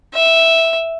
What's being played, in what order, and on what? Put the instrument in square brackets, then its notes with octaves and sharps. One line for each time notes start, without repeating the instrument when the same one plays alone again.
[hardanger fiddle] E5